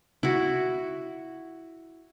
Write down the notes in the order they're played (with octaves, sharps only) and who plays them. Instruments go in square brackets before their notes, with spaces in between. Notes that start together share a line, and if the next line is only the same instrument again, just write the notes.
[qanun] E4 F#4